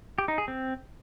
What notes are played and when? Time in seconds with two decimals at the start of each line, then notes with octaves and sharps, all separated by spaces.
0.18 G4
0.28 D#4
0.38 G#4
0.48 C4